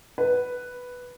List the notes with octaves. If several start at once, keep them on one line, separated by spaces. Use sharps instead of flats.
B4